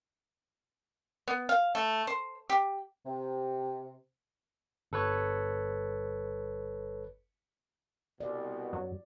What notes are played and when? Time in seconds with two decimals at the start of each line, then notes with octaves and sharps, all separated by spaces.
1.28 B3
1.49 F5
1.75 A3
2.07 C5
2.50 G4
3.05 C3
4.92 G1 A4 B4 C#5
8.20 C2 B2 D5
8.73 F#2 F#3